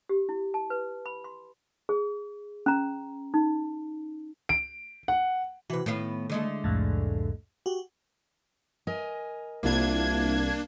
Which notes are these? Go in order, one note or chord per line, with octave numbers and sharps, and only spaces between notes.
G4
E4
A5
B4
B5
C6
G#4
C#4 A#5
D#4
D7
F#5
C3 E3 F#4 B4
A2 D#3 B3 F5
D3 G#3 A3
C2 F2 A2
F#4 G4
A#4 D#5 G#5
C2 A#3 D4 E4 F4 G#6